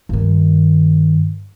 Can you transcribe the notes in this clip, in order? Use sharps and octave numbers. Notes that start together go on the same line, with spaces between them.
G2 D#3